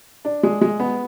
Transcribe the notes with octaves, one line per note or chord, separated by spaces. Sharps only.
D4
G#3
G#3
B3